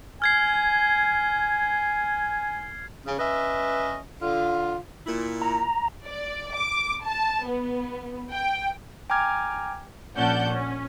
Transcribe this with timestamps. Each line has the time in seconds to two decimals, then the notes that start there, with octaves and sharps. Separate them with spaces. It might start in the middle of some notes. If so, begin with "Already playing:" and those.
0.22 G#5 F6 G#6 C7
3.06 C#3
3.19 C#4 B4 D#5 E5
4.22 D3 F4
5.06 A#2 E4
5.42 A#5
6.06 D5
6.53 D6
7.05 A5
7.47 B3
8.31 G5
9.10 G5 G#5 A#5 D6 F6 G#6
10.16 A#1 C#4 D5 F#5 A5 G6
10.48 C#4